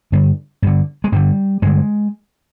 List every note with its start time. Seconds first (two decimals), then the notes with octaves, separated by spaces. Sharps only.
0.12 G2 D3
0.62 G2 D3
1.04 G#3
1.12 G2 D3 G3
1.62 G2 D3 G#3